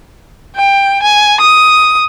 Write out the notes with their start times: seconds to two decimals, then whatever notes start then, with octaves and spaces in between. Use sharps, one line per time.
0.56 G5
1.02 G#5
1.40 D#6